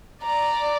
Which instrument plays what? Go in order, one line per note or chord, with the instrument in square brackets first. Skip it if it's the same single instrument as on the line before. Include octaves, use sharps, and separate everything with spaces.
[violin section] D5 [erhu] A#5